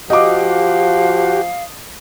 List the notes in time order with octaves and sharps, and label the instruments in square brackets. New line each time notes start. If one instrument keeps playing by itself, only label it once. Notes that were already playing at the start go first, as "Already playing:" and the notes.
[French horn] F3 [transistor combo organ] F#4 G4 [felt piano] D#5 D6 [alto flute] F5